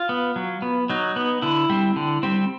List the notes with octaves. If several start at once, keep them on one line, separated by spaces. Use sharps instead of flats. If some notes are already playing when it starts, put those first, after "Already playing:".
Already playing: F4
B3
F#3
B3
F#3 D#4
B3
D3 E4
G3 C4
D3
G3 C4